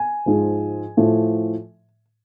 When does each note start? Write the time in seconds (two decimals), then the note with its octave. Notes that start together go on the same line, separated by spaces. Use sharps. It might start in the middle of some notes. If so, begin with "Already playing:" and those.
Already playing: G#5
0.26 G#2 F3
0.97 A2 F3